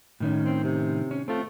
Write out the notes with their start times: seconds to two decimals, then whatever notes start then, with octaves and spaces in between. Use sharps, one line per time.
0.20 A2 D#3 C#4
0.44 C4
0.64 C3
1.11 C#4
1.28 A3 C4 F4